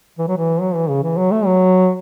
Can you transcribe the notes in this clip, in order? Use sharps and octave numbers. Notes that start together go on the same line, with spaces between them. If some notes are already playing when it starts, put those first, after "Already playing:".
E3
F#3
E3
F#3
E3
C#3
E3
F#3
A3
F#3